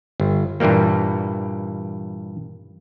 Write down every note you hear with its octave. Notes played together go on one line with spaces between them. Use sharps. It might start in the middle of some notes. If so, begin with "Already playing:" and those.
G1
G2 A#2 E3 G3 A#3